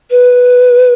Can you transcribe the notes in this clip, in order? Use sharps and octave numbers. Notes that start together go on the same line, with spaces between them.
B4